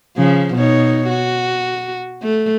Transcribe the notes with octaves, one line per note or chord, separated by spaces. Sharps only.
C#3 F3
B2 D#4 C#5
F#4
A3